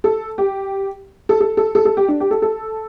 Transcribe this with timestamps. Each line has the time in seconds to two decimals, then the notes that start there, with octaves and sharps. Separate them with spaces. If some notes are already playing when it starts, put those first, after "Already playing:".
0.04 A4
0.38 G4
1.29 A4
1.40 A4
1.57 A4
1.75 A4
1.85 A4
1.97 G4
2.08 D4
2.20 G4
2.31 A4
2.42 A4